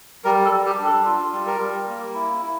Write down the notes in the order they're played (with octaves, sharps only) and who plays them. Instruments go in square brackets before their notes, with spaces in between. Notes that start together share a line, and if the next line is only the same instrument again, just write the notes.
[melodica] G3 A#4
A4
G3
G4
D4
A4
F4
G3
A#4
G3
A#3
E4
E4